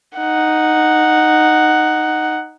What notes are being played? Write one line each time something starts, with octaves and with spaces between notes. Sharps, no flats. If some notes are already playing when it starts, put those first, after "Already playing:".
D#4 F#5